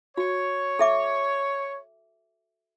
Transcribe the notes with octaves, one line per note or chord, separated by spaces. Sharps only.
F#4 C#5
A4 E5 D6